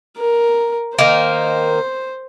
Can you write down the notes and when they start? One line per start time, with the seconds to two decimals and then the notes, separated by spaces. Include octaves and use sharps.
0.17 A#4
0.99 D#3 A#3 C5